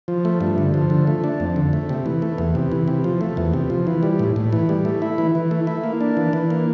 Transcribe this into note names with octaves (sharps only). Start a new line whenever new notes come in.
F3
A3
G2
D3
F3
D3
A3
D4
F2
D3
A3
C3
E3
A3
E2
C3
E3
C3
F3
A3
E2
C3
F3
E3
G3
A2
A2
E3
G3
A3
E4
E3
E3
A3
E4
A#3
D4
E3
E3
A#3